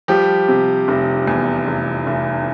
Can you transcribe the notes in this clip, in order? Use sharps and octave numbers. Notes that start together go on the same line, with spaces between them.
F3 G3 G4
C3
F1
E2
F1
F1